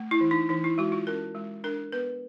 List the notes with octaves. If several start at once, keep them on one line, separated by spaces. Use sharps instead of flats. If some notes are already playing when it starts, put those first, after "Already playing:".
Already playing: A3
E4
E3
D#4
E3 D#4
E4
G#3 F#4
F4
C#4 A#4
G#3
D4 A#4
B3 B4